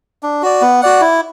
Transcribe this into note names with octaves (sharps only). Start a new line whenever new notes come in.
D4
F#4 D5
B3
F#4 D5 F#5
E4